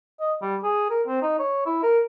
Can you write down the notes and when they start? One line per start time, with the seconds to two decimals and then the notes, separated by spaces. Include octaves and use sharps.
0.20 D#5
0.42 G3
0.63 G#4
0.90 A#4
1.07 C4
1.22 D#4
1.39 C#5
1.66 E4
1.83 A#4